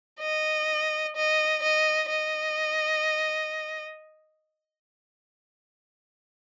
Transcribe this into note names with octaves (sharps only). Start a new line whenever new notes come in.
D#5
D#5
D#5
D#5